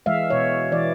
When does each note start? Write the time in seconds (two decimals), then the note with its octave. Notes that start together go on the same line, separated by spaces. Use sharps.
0.06 E3 G#3 E5 F5
0.30 B2 C#5
0.72 E3 D5